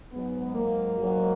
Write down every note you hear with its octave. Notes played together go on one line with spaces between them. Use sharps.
G#2 F#3 B3
A#3
G#2 F#3